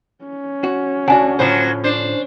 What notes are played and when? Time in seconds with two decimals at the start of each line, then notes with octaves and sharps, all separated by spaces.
0.25 C#4
0.64 F#4
1.08 D2 D4 F#4 F#5 G#5 A5
1.39 A2 D3 F3 F#3 A#3 C5
1.84 D4 C5